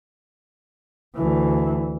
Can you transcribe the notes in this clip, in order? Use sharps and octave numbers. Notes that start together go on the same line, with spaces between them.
D2 E3